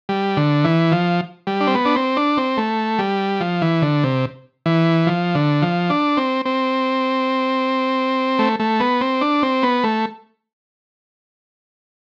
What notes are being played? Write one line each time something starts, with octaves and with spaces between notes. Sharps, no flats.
G3
D3
E3
F3
G3
D4
C4
B3
D4
C4
D4
C4
A3
G3
F3
E3
D3
C3
E3
F3
D3
F3
D4
C4
C4
A3
A3
B3
C4
D4
C4
B3
A3